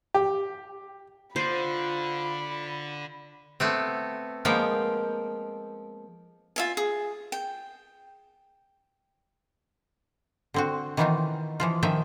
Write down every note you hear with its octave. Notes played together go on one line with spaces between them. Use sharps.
G4
D3 F4 C5 B5
A3 B3 C4
F3 G#3 A#3 B3 G5
F4 E5 G#5
G#4
G5
D3 C4 F#4
D#3 E3 B3 C4 D#4 F4
E3 F3 F4
D#3 F3 D#5 E5 G5